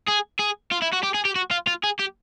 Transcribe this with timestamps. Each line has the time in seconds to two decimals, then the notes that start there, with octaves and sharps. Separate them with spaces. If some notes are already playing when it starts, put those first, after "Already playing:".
0.07 G#4
0.39 G#4
0.71 F4
0.82 E4
0.93 F#4
1.03 G4
1.14 G#4
1.25 G4
1.36 F#4
1.51 F4
1.67 F4
1.83 G#4
1.99 G4